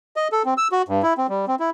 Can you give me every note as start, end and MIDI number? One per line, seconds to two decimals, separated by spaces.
0.16 0.28 75
0.32 0.43 69
0.45 0.54 60
0.57 0.68 88
0.72 0.82 66
0.88 1.02 43
1.03 1.14 64
1.17 1.27 60
1.29 1.45 55
1.48 1.55 60
1.60 1.70 64